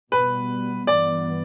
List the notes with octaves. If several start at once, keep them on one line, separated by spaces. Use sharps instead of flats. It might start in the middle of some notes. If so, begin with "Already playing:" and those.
B2 G3 B3 B4
G2 E3 B3 D5